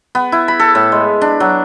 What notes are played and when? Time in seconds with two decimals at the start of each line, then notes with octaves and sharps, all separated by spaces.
0.15 B3
0.32 E4
0.48 B5
0.59 A4
0.75 A2
0.92 G#3
1.21 D4
1.40 F#3